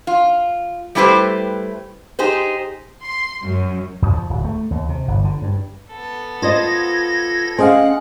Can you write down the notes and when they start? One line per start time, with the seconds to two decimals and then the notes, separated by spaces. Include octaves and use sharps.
0.07 F4
0.95 G3 A3 E4 G4 B4 C5
2.19 D#4 G4 G#4 C5
3.04 C6
3.43 F#2
4.02 E2
4.14 F3
4.30 D1
4.45 A3
4.71 D#2
4.89 C3
5.08 G1
5.24 D3
5.42 G2
5.90 B3 A4
6.42 F4 C5 D#5 G#6 A#6
7.59 C4 C#4 G#4 C5 D#5 F5 F#5